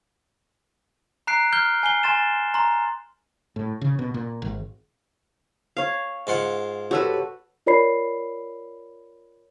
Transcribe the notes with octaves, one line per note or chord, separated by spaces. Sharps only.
A#5 F#6 C7 D7
F6 G6 G7
G#5 G6 C7 G7
G#5 C6 A6 E7
A#5 C6
A2
C#3
B2
A#2
G#1
C#5 F5
G#2 F4 F#5
F#4 G4 A4 B4 C#5 E6
F4 A#4 C#5 D5 B5 C7